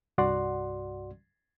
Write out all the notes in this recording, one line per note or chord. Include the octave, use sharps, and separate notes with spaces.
C2 G2 F#4 D5 F#5 C6